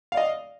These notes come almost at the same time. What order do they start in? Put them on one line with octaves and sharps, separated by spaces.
F5 D5 D#5